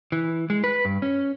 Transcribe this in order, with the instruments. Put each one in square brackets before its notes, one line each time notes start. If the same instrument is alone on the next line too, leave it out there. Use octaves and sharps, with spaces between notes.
[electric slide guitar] E3
G#3
B4
G2
C#4